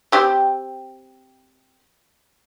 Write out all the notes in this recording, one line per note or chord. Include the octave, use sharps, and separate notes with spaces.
C4 G4 C5